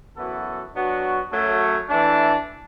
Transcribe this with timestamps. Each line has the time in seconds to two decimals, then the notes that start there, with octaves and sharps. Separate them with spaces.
0.16 F#2 E3 B3 F#4 A4
0.74 F#3 B3 D4 F#4
1.31 F#2 F#3 A3
1.89 E3 A3 D4